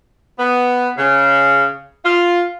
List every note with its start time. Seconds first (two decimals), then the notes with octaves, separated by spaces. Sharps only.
0.40 B3
0.98 C#3
2.05 F4